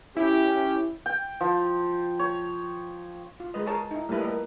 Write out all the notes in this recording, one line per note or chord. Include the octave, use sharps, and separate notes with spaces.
C#4 E4 G4
G5
F3
C#5
F4
G#3 B4 D#5
G#4 A#4 C#5 A5
D#4 E4
G3 A3 A#3 E4 B4
A#3 B4 D#5